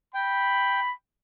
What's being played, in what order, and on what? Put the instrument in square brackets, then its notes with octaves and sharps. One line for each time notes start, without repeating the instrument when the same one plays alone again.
[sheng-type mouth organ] G5 [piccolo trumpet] B5